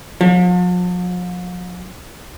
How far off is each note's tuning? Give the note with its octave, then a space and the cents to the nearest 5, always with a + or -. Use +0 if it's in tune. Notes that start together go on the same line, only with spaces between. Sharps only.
F3 +45